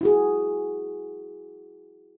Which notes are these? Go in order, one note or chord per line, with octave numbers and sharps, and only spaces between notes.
E4 F#4 G#4